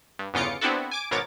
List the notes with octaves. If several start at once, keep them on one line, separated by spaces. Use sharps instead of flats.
G2
G1 E2 C#3 F4 D6 C#7
B3 C4 D4 E4 F#4 A4
G#5 D6 D7
G#1 B2 A#4 C#5 D6 A6